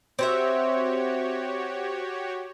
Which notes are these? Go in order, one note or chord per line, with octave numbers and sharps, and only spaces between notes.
C4 F#4 G4 C5 C#5 E5